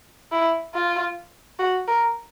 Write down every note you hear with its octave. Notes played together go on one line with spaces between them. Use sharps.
E4
F4
F#4
A#4